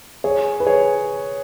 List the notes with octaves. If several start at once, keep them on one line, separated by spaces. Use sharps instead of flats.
G#4 C#5
B4
G#4 C#5